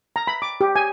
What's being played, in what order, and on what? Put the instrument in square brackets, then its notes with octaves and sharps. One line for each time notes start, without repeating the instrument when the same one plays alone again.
[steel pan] A#5
B5
D6
G4
G#5